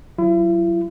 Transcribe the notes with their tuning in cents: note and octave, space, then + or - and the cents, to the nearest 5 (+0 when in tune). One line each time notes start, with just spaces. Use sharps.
F#3 +0 E4 +40